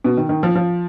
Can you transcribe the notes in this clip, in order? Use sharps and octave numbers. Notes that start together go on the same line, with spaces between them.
B2
D#3
D#3
F3
F3